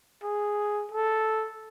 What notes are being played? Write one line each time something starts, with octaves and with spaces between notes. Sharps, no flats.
G#4
A4